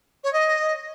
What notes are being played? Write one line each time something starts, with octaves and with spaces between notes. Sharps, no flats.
C#5
D#5